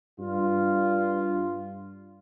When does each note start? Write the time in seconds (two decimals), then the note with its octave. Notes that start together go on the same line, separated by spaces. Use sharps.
0.19 G2 F4